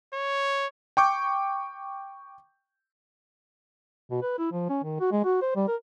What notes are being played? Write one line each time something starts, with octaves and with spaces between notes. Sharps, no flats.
C#5
G5 C#6 D6 G6
B2
B4
E4
F3
C#4
D#3
F#4
G#3
F#4
C5
G3
A#4